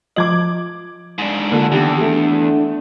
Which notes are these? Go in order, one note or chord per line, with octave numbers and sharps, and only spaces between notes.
F3 F4 D#5 D6 G#6 F#7
G#2 D4
D3 A#3 F4 A5
E2 D#3 G4
A3 D4